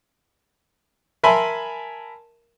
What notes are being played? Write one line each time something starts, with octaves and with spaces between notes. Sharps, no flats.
A#4 E5 G#5 A5 B5 C6